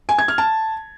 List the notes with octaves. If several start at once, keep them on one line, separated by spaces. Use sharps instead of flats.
G#5
G#6
F6
A5